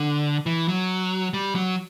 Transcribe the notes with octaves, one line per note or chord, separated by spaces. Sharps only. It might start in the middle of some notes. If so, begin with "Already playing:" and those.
Already playing: D3
E3
F#3
G3
F#3